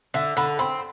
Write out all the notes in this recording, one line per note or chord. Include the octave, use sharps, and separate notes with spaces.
D3 E5
D3 B5
C4 B5